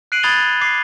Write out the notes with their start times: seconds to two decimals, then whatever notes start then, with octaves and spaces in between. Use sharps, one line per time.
0.12 F#6 C7 D7 D#7 F#7
0.23 B5 D#6 G#6 A6 F7 G7
0.61 D6 C7